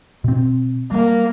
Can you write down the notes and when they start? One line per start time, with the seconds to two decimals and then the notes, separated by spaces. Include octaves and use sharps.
0.24 B2 C4
0.92 G3 A#3